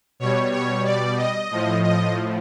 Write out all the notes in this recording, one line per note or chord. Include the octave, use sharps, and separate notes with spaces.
B2 G3 C#5
C#5
D5
D#5
A2 F3
D#5